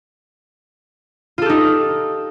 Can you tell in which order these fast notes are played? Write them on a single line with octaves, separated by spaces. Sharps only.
F4 A4 G4 D#4